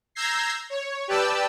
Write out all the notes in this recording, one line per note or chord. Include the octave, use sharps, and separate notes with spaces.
A#5 E6 G6 G#6 A#6 C7
C#5
G4 B4 D5 G5 A5 E6